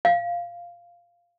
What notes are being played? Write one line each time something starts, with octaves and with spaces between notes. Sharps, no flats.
F5